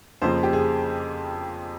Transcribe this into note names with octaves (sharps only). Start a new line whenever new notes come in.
F2 C#3 F3 A#3 C5
G4
G#4